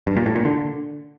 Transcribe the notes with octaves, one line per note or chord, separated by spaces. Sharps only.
G2
A#2
A2
A#2
D3